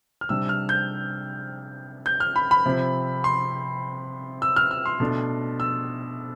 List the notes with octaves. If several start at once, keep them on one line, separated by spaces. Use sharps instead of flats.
F6
C3 G3 D4 E6
F6
G6
G6
F6
B5
B5
C3 F3 C4
C6
E6
F6
E6
C6
B2 A3 D4
E6